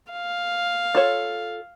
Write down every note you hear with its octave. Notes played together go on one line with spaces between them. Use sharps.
F5
F4 A4 C#5